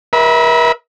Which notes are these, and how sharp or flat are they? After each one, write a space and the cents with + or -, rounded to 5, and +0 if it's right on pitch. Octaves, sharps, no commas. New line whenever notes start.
A#4 +40 E5 -30 B5 +0